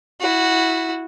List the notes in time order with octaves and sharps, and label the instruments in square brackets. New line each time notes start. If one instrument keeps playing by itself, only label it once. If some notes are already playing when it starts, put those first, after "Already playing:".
[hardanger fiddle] E4 F#4